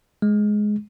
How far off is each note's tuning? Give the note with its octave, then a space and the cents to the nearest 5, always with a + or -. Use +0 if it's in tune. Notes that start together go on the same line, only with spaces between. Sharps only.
G#3 +10